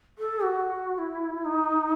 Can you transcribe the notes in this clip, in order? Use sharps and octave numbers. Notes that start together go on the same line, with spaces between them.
A4
F#4
F#4
E4
D#4